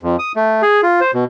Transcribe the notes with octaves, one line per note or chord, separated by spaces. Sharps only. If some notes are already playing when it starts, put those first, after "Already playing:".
F2
D#6
A3
G#4
F4
C5
B2